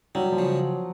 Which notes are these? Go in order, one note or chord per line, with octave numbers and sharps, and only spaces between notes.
F#3 G3
F3
C#3